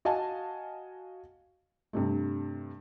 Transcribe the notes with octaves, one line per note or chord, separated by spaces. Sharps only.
F#4 D#5 F5 G#5 A5
G2 C3 A3